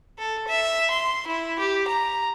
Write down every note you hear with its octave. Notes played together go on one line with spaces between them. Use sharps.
A4
E5
C6
E4
G4
A#5